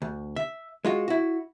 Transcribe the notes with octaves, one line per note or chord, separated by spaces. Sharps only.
D2
E5
G#3 F4 F#4
E4 F#4